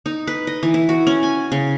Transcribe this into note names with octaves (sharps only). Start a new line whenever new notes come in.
D#4
B4
D#5
E3
E4
F#4
C#4
G#5
C#3